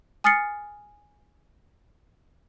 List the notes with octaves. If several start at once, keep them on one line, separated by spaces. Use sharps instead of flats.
G#5 D#6 F6 A6 C7 C#7